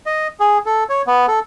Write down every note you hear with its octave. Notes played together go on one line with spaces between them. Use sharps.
D#5
G#4
A4
C#5
B3
A4